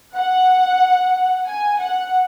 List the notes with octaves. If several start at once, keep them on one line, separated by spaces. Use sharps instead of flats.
F#5
G#5
F#5